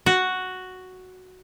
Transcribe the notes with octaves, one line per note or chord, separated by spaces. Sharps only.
F#4